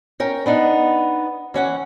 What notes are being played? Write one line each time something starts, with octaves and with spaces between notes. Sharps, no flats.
C#4 A#4 G5
B3 D4 D#4
E3 C#4 F#5